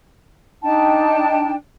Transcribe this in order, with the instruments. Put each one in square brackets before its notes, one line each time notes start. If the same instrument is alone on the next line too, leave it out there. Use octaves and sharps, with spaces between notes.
[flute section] D4 D#4 G5 A5